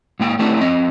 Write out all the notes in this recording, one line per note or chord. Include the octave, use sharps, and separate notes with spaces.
G#2 A#3 G5
A3 C4 D4 E4 G4
F2 C4 D#5